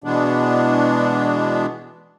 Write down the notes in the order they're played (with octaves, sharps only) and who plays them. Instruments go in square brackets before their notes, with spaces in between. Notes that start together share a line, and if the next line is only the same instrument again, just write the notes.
[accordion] B2 E3 G#3 B3 D4